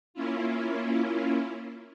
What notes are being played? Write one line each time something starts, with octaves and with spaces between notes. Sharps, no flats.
A#3 C#4 E4 F4